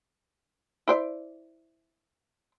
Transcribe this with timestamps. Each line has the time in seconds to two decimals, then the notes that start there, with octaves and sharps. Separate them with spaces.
0.88 E4 C5 D5